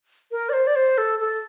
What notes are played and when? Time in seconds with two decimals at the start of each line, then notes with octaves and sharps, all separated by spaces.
0.31 A#4
0.49 D5
0.53 C5
0.67 D5
0.76 C5
0.98 A4
1.20 A4